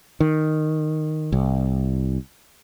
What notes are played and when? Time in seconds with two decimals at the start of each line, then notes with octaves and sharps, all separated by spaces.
0.20 D#3
1.32 C2